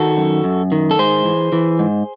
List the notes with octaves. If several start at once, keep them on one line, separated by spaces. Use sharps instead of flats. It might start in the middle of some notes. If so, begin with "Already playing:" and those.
Already playing: D#3 F#4 A4
F#2
F#2
D#3
A4
G#2 G#4 C5
E3
E3
G#2